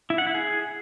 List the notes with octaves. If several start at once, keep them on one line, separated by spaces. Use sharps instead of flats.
E4
F#5
E4
G#4